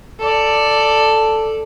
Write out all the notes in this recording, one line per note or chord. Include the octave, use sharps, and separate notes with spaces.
A4 D5